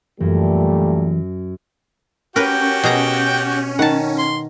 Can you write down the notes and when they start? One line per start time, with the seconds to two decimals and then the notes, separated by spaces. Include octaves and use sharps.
0.20 F#2 A#2 E3 G3 A3
2.36 C#4 F#4 G4 A#4 B4 G5
2.84 B2 G#4 A#5
3.79 D#3 F#5 A5
4.18 C6